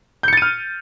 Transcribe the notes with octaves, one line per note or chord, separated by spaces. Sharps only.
F6 G6 A6 C#7 D#7